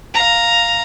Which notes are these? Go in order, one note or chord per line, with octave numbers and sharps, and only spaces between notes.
F5 A#5